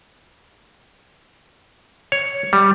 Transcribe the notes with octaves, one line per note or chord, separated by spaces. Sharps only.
C#5
G3